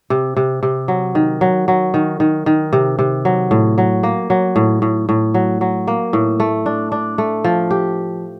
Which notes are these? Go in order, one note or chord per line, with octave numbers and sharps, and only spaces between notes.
C3
C3
C3
F#3
D#3
F#3
F#3
D#3
D#3
D#3
C3
C3
F#3
A2
F#3
A#3
F#3
A2
A2
A2
F#3
F#3
A#3
A2
A3
D4
D4
A3
F3
G4